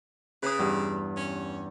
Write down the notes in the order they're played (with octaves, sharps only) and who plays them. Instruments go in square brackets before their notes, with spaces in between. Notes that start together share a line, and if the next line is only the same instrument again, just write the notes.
[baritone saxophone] C#3 [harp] B4 D#6
[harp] E2 G2
[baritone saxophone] C#4